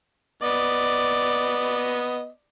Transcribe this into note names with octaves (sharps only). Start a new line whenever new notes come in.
B3 D5 D#5